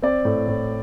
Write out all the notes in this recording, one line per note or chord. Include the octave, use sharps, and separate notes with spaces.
C4 D5
A2
A2